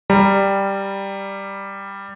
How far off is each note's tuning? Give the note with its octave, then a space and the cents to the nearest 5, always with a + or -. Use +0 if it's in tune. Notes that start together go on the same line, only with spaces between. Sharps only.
G3 +5 A#5 +0